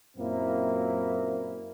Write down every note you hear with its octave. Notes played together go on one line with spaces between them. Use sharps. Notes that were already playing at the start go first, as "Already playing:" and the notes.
F#2 A#2 A#3 C4 E4